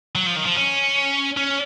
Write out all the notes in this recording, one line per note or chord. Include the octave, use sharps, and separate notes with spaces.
F#3
F3
D#3
F3
C#4
C#4